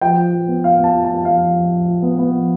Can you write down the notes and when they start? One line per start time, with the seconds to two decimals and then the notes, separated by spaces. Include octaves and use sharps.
0.01 F3 G5
0.17 F4
0.33 F3
0.48 B3
0.64 F4 F5
0.79 B3 A5
0.95 F4
1.05 A5
1.10 F4
1.25 F3 F5
1.42 F3
1.56 F3
1.71 F3
1.88 F4
2.02 B3
2.18 B3
2.34 F3